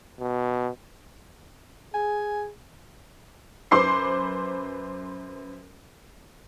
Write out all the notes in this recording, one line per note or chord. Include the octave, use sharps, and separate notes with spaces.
B2
G#4 G#5
F#2 B4 C5 C6 D6 C7